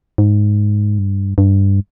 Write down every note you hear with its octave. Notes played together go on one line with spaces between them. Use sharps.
G#2
G2
G2